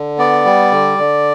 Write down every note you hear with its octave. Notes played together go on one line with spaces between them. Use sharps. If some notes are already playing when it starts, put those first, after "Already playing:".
Already playing: D3
B3 D5
G3
D3
D3